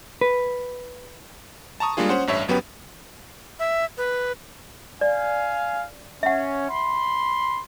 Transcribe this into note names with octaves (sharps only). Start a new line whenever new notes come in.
B4
A5 A#5 C#6 D#6
G3 G#3 A#3 D4 F4 G#4
C#4 C5 F#5
A1 G2 C#5 E5
G1 F#3 B3 C#4 G4 B4
E5
B4
D5 F5 G#5
C#4 E5 F#5
B5 C6